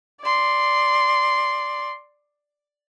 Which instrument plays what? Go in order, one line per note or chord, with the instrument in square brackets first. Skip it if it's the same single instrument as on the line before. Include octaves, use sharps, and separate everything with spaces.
[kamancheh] D5 C6